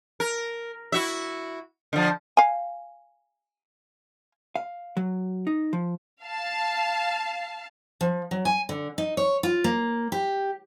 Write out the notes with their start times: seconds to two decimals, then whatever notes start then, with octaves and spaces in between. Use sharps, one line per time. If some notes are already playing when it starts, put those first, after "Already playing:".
0.20 A#4
0.92 E4 F#4 E5
1.93 D3 F3
2.37 F5 G#5
4.56 F5
4.97 F#3
5.47 D#4
5.73 F3
6.22 F5 A5
8.01 F3
8.31 F#3
8.45 G#5
8.69 D3
8.98 D#4
9.17 C#5
9.43 F4
9.64 A#3
10.12 G4